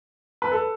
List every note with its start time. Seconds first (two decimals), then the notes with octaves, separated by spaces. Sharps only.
0.42 B4
0.52 A4